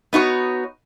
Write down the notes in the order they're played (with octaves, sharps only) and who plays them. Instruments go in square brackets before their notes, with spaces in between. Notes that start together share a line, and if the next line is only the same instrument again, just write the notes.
[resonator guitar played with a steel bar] B3 D#4 F#4 C#5